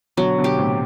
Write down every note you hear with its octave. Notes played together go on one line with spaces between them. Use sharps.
B2 D3 F#3
B2 D3
G4
A2 C3